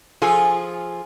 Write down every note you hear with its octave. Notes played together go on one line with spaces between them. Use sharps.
F3 F4 G#4 A4 G#5